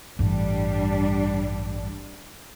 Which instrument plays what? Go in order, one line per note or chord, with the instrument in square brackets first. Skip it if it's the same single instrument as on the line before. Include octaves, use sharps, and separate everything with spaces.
[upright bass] A1 G2 [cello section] G3 D4